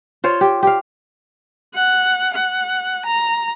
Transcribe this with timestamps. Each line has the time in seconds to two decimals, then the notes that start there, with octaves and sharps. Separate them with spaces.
0.24 F4 C5 C#5
0.41 G4
0.63 G4 F5
1.75 F#5
2.34 F#5
3.06 A#5